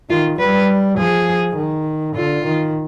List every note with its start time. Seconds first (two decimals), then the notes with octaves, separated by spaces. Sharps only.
0.10 D#3 F4
0.39 G3 B4
0.98 F3 G#4
1.56 D#3
2.15 D3 F4
2.45 D#3